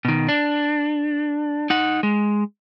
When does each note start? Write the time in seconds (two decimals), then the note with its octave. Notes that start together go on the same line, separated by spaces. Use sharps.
0.05 B2 D#3
0.28 D4
1.70 D#4 F#5
2.03 G#3